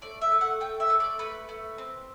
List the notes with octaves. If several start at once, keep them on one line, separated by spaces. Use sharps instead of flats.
A3 D5
E5
A3
F#5
A3 G5
E5
A3
D5
A3 B4
A3
C4